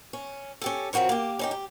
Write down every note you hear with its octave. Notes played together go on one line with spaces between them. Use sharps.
C#4
C#4 G4 A4
F3 C4 F#4 A#4 C#5
A#3 G4
C#4 D#4 G4
G4